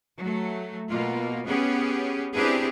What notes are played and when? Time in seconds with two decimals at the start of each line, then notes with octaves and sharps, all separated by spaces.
0.18 F#3 A3
0.89 B2 A#3 F4
1.46 B3 C#4 G4 G#4
2.34 C4 D4 E4 G4 G#4 B4